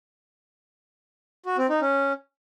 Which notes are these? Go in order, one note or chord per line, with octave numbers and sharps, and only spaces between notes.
F#4
C4
D#4
C#4